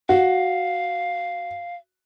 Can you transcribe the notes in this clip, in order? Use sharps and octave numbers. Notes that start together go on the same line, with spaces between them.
F#4 F5